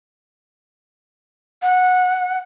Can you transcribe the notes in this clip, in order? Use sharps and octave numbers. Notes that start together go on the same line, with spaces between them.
F#5